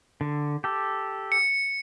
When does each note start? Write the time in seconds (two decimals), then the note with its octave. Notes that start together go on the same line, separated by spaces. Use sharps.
0.21 D3
0.64 G4 A4
1.32 C#7